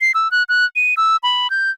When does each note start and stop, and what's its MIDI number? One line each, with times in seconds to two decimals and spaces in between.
0.01 0.12 96
0.14 0.30 88
0.31 0.43 90
0.49 0.65 90
0.76 0.94 99
0.97 1.17 88
1.23 1.50 83
1.50 1.71 91